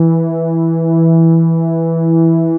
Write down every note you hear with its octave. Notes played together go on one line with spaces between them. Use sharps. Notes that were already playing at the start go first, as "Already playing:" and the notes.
Already playing: E3